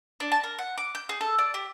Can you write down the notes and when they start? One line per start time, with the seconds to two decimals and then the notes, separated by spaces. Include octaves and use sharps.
0.20 D4
0.32 A5
0.44 A#4
0.59 F#5
0.78 D6
0.95 G6
1.09 G#4
1.21 A4
1.39 D5
1.54 G4